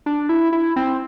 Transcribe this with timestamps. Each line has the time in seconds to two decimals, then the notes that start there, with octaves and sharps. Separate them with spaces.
0.06 D4
0.29 E4
0.53 E4
0.76 C4